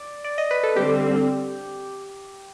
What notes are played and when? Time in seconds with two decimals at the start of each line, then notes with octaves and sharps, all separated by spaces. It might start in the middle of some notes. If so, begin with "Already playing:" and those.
Already playing: D5
0.24 D5
0.38 D#5
0.51 B4
0.63 A4
0.76 D3 G3 C4 G4